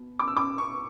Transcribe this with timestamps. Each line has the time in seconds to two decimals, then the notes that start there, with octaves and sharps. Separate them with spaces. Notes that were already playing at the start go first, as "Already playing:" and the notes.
Already playing: B2
0.19 D6
0.28 E6
0.37 D6
0.58 C#6